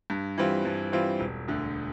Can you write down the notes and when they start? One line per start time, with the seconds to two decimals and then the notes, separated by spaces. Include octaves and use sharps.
0.10 G2
0.38 E3 G3 C4 F4
0.65 G2
0.92 E3 G3 C4 F4
1.20 E1
1.48 D2 D3